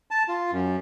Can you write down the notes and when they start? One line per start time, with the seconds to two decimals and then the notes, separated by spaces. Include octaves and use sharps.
0.11 A5
0.28 F4
0.52 F#2